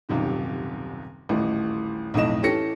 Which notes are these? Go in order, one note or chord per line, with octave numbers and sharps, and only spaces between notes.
D#1 B1 F#2 C3 D#3
D#1 A1 A2 E3
B1 F2 A2 D#5 E7
E3 C#4 G4 A4 A#6 C#7